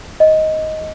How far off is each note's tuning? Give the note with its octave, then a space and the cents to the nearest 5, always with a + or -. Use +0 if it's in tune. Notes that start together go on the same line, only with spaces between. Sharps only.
D#5 +10